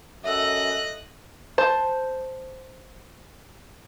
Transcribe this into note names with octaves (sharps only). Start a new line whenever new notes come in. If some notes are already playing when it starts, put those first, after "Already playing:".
F#2 A4 D#5 E5 E6 F#6
C5 A5